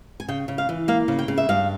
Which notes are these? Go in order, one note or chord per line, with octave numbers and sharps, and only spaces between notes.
G#5
C#3 G5
C#3
F5
E3
A#3 F5
C#3
G5
C#3
E5
G2 F5